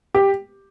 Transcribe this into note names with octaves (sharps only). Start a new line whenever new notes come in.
G4